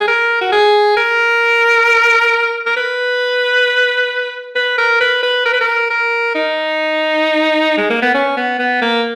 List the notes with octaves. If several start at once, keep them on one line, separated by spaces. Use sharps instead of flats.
G#4
A#4
F#4
G#4
A#4
A#4
B4
B4
A#4
B4
B4
A#4
B4
A#4
A#4
D#4
G#3
A#3
B3
C#4
B3
B3
A#3